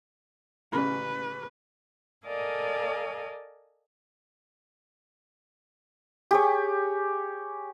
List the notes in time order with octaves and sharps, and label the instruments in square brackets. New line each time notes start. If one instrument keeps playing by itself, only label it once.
[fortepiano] A1 C#3 B5 [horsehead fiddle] B4
[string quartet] A4 A#4 D5 D#5 F5 G#5
[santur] G4 G#4 C#5